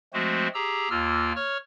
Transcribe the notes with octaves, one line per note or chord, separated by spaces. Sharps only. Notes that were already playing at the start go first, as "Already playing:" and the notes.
F3 G#3 A3 C4 F#4 C5
G4 G#4 A#5 E6
D#2 A#3 F4 E6 F6
C#5 C#6 F6